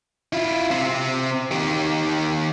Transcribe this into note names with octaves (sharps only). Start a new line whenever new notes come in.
E4 F4
C3 C4
D#3 G4